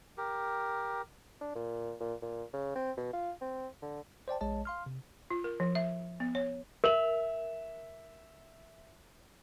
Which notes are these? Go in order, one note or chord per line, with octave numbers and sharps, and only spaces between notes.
G4 A#4
D4
A#2
A#2
A#2
C#3
C4
B2
F4
C4
D3
C5 D5 G5 A5
A#1 G#3 C#5 D#5 A5
F5 C6 F6
C3
F4
A#4
F3
E5
B3
C#5
A#4 E5 F7 F#7